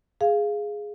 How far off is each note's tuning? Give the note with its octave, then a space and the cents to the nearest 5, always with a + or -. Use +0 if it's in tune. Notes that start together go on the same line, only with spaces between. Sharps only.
G#4 +0 F5 -10